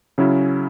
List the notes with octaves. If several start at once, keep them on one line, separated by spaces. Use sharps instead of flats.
C#3 F#3 C#4 E4